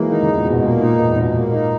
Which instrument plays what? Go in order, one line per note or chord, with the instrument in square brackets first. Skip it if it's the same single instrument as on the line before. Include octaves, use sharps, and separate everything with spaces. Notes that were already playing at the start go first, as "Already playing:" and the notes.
Already playing: [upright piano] E3 F#3 G#3 [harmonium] A#3
[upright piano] D#3 [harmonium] D#4
[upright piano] C#3
[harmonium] E2
[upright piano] A#2
[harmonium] B2
[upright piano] G#2
[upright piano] A#2 [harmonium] A#3
[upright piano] A#2 [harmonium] D#4
[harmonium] E2 [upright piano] G#2
[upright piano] G#2 [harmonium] B2
[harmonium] A#3
D#4